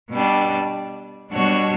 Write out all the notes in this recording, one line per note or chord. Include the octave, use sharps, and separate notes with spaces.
B2 G3 D4
B2 G3 D4 F#4 C#5